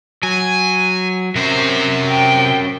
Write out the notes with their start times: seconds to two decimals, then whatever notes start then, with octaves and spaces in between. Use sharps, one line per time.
0.23 F#3 G#5
1.36 C3 C#4 F#4 A#4 C5
2.09 G5